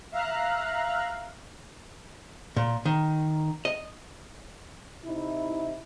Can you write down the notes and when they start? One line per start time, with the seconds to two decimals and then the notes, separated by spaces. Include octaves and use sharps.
0.12 E5 F5 A#5 F6 F#6
2.57 A#2
2.85 D#3
3.65 D#5
5.05 C3 D#4 E4